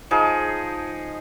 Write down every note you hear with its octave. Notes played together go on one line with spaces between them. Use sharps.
F3 D#4 G#4